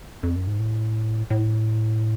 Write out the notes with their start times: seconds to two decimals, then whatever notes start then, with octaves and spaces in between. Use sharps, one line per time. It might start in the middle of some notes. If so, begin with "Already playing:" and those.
0.23 F2
0.36 F#2
0.47 G#2
0.59 A2
1.30 A2